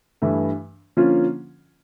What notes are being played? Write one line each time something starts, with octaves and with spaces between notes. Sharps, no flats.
G2 E3 A3
D3 F3 A#3 C#4 F4